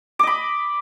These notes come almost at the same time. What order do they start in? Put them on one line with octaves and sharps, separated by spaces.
D6 D#5 B5